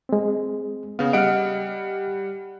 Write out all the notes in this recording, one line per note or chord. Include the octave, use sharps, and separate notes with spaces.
G#3 C4
C#3 B3 F5
G3 D#5 F#5 F6 D7